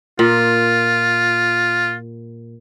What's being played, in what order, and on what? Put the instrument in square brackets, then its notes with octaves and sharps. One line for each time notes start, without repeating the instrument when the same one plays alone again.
[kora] A#2 [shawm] F4